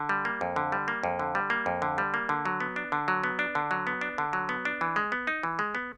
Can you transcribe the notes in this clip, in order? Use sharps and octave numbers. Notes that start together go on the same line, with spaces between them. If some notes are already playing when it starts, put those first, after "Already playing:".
Already playing: D3
G3
A#3
F2
D3
G3
A#3
F2
D3
G3
A#3
F2
D3
G3
A#3
D3
F#3
B3
D4
D3
F#3
B3
D4
D3
F#3
B3
D4
D3
F#3
B3
D4
E3
G#3
B3
D#4
E3
G#3
B3